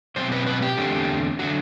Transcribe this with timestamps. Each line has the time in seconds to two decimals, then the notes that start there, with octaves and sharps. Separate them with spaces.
0.16 B2 F#3 C4 C5
0.32 B4
0.47 B4
0.62 G4
0.77 E2 D3 A3 C4
1.39 D3 F#3 F#4